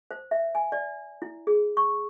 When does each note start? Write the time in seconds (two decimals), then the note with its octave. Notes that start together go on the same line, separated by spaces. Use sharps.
0.11 C5
0.31 E5
0.55 G#5
0.72 D5
1.22 E4
1.47 G#4
1.77 C#6